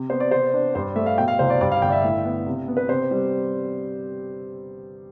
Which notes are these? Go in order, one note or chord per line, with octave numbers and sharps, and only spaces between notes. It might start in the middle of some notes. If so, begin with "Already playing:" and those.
Already playing: C3
B3 C5
D5
C3 C5
D4
G2 C5
A3 E5
F5
B2 G5
F5
C2 C5
D5
G2 D5
F5
G1 G5
D5
E5
A2
B3
C3
B3
B4
C3 C5
G3